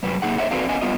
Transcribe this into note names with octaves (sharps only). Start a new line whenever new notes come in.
G2 C3 F#3 B4
C3 G#3 A#3 D#4 G#4 F#5
D4 C5 C#5 E5 F#5
C4 F#4 A4 B4 D5 F5
B3 C#4 D#5 G#5
G3 B3 F4 D#5